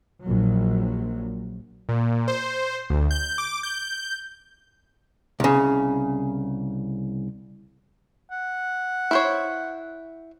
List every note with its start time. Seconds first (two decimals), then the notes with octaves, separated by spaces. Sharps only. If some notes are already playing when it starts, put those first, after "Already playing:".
0.22 A#1 F#3
1.89 A#2
2.28 C5
2.90 D2
3.11 G6
3.38 D6
3.63 G6
5.40 C2 C#3
8.31 F#5
9.11 E4 C5 C#5